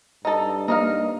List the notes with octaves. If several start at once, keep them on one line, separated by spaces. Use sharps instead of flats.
G2 D#4 A4
A#3 D#4 D#5 F5